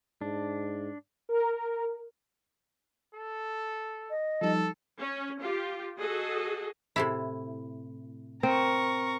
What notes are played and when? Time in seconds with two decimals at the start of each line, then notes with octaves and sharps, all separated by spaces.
0.21 G#2 D4
1.29 A#4
3.14 A4
4.10 D#5
4.41 F3 G3 D#4 A4
4.99 C#4
5.42 F4 G4
5.99 F#4 G#4 A4 D#5
6.96 A2 C3 E4
8.43 C4 A#4 C#6